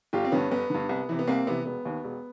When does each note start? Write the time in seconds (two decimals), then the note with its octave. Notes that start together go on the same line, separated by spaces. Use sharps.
0.13 G1 F4 G4
0.25 C4
0.32 G2 D3 B3 C#4
0.51 G1 B3
0.70 G2 D3
0.89 C2
1.09 C3 E3
1.19 B3
1.27 C2 A#3 C4
1.47 C3 E3 B3
1.65 E1 B3
1.85 D#2 D#3
2.04 E1